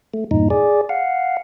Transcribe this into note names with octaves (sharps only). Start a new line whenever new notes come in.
A3
E2 G2 A#2 D#4
G#4 D5
F5 F#5